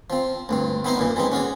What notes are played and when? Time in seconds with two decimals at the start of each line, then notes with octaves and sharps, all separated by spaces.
0.10 F3 C4
0.49 D2 G2 C4
0.84 B3 C4 D#4 E4 C5 A#5
0.97 F#2 A#2 E3
1.16 E3 G3 G#3 C4 D#4
1.32 C#4 F#4 G#4 D5